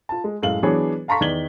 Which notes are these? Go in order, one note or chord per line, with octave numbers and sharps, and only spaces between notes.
F4 A5
G#3
F#2 A2 G#3 F5 F#7
E3 F#3 B3 D4 G#4 C#5
F5 A5 A#5 C6 C#6 B6
E2 D#3 D5 G#6 F#7 G7